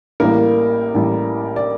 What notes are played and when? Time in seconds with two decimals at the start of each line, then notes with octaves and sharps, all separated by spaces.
0.20 A1 A2 G3 A#3 A#4
0.94 A1 A2 G3
1.56 D5